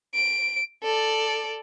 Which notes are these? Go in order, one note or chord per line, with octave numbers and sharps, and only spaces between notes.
D7
A4 D5